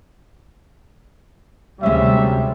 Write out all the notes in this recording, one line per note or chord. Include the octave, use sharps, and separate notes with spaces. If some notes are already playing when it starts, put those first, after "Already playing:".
D2 C3 G3 G#3 C#4 E5